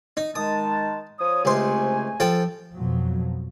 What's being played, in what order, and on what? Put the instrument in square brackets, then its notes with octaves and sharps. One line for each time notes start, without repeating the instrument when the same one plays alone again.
[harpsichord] D#4
[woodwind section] D#3 G#3 A5 [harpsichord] D#6
[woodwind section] F3 C#5 D#6
[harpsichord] C#2 C5 [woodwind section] C3 A3 G#5
[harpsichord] F3 A4 G5
[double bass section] F2 B2 F3 F#3